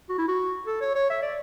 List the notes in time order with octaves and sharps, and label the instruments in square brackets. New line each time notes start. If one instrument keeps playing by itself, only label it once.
[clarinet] F#4
E4
F#4
A4
C#5
C#5
E5
D5